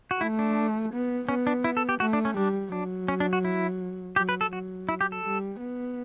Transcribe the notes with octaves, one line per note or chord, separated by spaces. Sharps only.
F#4
A3 E4
D4
B3
B3 C#4
D4
E4
A4
G4
A3 F#4
D4
C#4
G3 D4
F#3 D4
C#4
D4
F#4
E4
F#3 G4
B4
A4
F#3 F#4
E4
G4
A4
G3
B3